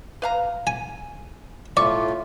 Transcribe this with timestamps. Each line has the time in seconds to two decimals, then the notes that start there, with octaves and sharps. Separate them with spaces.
0.22 B4 F5 A#5
0.67 G#5
1.77 A2 A3 F4 D5 C#6